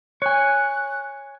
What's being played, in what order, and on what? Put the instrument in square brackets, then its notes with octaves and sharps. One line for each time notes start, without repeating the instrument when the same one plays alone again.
[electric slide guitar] C#5 G#5 [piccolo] F#6